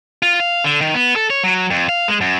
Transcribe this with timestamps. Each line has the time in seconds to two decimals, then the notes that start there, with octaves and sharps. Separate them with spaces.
0.23 F4
0.40 F5
0.64 D3
0.81 D#3
0.94 B3
1.16 A4
1.30 C#5
1.44 F#3
1.71 F2
1.89 F5
2.08 G#3
2.21 F#2